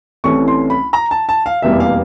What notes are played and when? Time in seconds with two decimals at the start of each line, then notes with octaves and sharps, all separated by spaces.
0.24 C2 C3 E3 A3 C#4 C#6
0.48 C6
0.70 B5
0.93 A#5
1.11 A5
1.29 A5
1.46 F5
1.62 F1 E2 B2 G3 A#3 E5
1.80 F5